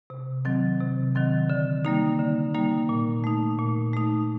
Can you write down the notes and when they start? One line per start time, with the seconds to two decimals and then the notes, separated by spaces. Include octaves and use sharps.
0.10 C3
0.45 D#3 F#3 C4
0.80 C3
1.15 D#3 F#3 C4
1.50 D3
1.85 G3 A#3 D#4
2.19 D3
2.54 G3 A#3 D#4
2.89 A#2
3.24 A3 D#4
3.59 A#2
3.94 A3 D#4